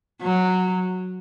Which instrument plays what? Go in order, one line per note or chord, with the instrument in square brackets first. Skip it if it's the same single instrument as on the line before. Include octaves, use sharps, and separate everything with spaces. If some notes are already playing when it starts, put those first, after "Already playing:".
[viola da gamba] F#3